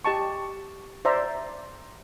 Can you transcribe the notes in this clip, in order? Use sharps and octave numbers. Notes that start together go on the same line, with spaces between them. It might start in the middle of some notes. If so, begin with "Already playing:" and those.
G4 D#5 A5 C#6
C5 D5 E5 A#5